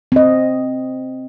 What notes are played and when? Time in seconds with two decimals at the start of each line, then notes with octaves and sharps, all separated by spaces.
0.12 C4 D#5